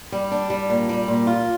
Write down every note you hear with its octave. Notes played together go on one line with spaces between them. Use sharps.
G3
D4
G3
A#2
G3
A#2
F4